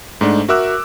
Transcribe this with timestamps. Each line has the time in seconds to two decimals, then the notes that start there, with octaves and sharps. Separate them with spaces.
0.21 G#2 A3 D4
0.49 F#4 A#4 E5 D6 E6 F#6